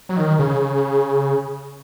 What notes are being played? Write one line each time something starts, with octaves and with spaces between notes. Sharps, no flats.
F#3
D#3
C#3